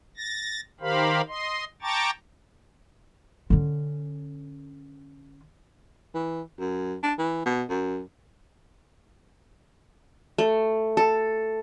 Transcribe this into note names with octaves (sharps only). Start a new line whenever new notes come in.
A6 A#6
D#3 G4 A#4 C5 F5 B5
D#5 C6
G5 A5 A#5 C#6 D6 A6
D3 C#4
E3
F#2
D4
E3
B2
F#2
A3
A4